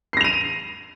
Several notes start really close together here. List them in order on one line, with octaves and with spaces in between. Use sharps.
C7 A#6 F7 D#7